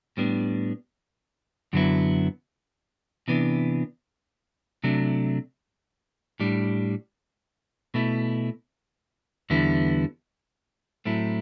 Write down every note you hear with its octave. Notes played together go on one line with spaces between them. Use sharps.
A2 G3 B3 D4
F#2 D3 F#3 B3 E4
C3 E3 B3 D4
C3 F#3 A3 D4
A2 G3 D4
B2 A3 E4
E2 D3 G3 B3 E4
A2 F#3 A3 C4 E4